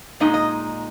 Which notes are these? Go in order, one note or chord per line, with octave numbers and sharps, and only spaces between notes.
A#2 G#3 D#4 D#5
D#5